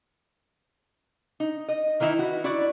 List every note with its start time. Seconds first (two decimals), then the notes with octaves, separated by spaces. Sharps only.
1.40 D#4
1.68 D#5
2.00 D#3 E3 D#4 E4
2.19 F#4 B4
2.44 E4 F#4 D5